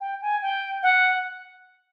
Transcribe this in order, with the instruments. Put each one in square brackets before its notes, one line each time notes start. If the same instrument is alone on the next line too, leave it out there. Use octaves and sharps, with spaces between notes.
[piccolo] G5
G#5
G5
F#5